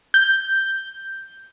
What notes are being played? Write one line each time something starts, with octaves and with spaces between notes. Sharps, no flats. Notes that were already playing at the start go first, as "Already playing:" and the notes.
G6